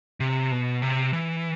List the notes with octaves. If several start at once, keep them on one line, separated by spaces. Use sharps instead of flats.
C3
B2
C3
E3